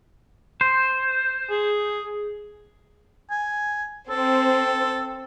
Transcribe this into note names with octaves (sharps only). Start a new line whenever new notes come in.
C5
G#4
G#5
C4 A4